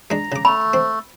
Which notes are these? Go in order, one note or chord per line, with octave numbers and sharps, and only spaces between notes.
G#3 D4 A#5
C#3 D6
A3 B5
C4